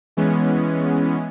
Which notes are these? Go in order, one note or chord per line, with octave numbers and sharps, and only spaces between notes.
E3 G#3 B3 C#4